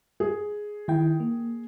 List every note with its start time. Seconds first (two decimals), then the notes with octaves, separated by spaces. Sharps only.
0.20 G#4
0.88 D#3 E4 G5
1.20 A#3